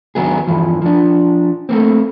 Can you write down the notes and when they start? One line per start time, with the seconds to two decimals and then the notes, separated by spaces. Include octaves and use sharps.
0.15 D#2 F#3 B3 G#4
0.47 E2 G2 E3 F3
0.82 F3 D4
1.69 A3 A#3 C4